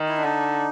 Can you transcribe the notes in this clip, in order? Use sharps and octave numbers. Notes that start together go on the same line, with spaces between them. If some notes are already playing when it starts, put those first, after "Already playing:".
Already playing: D#3
E4
D4
D3 D#4